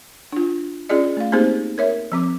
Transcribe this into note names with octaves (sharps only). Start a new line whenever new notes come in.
D4 F4
C#4 F4 G#4 D5 D#5
A3 F5
A#3 C4 D#4 G4 G#4 C5
A#4 C#5 E5
F3 C4 D6